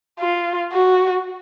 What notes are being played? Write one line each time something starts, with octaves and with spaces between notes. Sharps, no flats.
F4
F#4